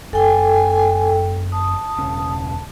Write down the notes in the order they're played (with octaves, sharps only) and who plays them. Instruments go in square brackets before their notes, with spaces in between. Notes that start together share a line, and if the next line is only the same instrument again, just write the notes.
[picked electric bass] F#1 [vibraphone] A4 G5 [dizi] G#5
[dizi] A5 [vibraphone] D#6
[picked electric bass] E1 C#3 C#4